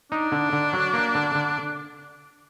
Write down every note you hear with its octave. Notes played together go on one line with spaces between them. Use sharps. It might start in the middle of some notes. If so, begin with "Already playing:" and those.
D4 D#4
D3
D3
F#3
A#3
D3
D3